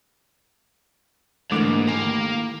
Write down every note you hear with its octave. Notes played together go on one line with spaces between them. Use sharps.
G#2 D3 E3 A3 A#3 D6
D#2 A2 A#3 A#4